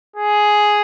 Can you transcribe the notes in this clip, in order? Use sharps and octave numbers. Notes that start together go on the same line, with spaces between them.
G#4